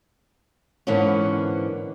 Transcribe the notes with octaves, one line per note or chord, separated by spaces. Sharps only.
G#2 D3 E3 A#3 B3 C#4